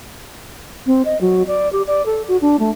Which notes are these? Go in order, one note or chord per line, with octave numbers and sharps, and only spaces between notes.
C4
D#5
F#3
D5
G4
D5
A4
F#4
D4
A3